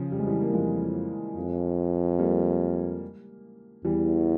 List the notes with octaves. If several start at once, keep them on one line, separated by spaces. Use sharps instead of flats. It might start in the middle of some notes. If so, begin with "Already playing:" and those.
Already playing: C#3 F3
F2 G3
G#3
E3 G3
A#3
F2 F3 G#3
F2
G3 A#3
E2 E3 G3